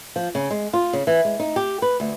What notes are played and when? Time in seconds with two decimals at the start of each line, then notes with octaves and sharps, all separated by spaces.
0.16 F3
0.35 C#3
0.50 G#3
0.73 F4
0.93 C#3
1.07 E3
1.25 G#3
1.39 D#4
1.56 G4
1.82 B4
2.00 D2